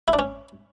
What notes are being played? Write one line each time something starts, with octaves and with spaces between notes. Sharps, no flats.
E4
D4
C#4